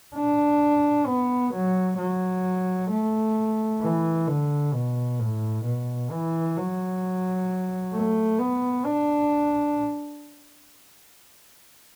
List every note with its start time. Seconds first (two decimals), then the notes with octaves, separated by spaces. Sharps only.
0.15 D4
1.07 B3
1.53 F#3
1.98 F#3
2.90 A3
3.81 E3
4.27 D3
4.74 B2
5.19 A2
5.65 B2
6.11 E3
6.57 F#3
7.94 A3
8.39 B3
8.86 D4